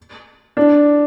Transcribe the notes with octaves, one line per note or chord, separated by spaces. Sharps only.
D4